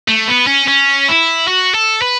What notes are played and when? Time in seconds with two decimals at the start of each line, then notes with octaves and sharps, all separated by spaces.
0.08 A3
0.28 B3
0.47 C#4
0.68 C#4
1.08 E4
1.48 F#4
1.75 A4
2.02 B4